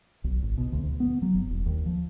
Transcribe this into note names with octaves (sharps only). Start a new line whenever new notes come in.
B1
G#1
B2
D2
D2
B3
F#3
F#1
E1
D#2
F3